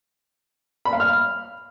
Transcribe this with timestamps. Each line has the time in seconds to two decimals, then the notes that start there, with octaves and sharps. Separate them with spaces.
0.85 B5
0.93 F5
1.00 F6